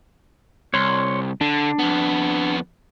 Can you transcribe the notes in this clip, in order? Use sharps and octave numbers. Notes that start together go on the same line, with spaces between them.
C2 C#5 C6
D3 D4
F2 B3